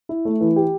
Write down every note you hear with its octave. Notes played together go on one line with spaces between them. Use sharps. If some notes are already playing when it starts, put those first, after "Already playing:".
E4
A3
E3
G4